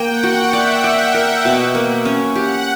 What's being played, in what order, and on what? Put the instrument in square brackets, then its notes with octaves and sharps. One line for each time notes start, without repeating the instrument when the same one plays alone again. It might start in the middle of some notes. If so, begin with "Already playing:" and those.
Already playing: [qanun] A#3 [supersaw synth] G5
[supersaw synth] F#5
[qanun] F#4
[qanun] D5 [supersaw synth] E5
[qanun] D5
A#4
B2
A#3
C#4
[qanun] G4 [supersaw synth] F#5